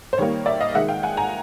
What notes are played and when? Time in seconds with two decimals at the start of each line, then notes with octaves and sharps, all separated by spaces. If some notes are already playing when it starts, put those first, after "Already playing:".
0.13 C5
0.18 D#3 G3 A#3 C#5
0.46 D5 E5
0.60 D#5 F5
0.74 D#3 G#3 E5 F#5
0.88 F5 G5
1.03 F#5 G#5
1.17 G#5 A#5